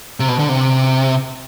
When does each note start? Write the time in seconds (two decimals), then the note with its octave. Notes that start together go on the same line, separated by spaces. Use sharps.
0.20 C3
0.28 B2
0.39 D3
0.49 C3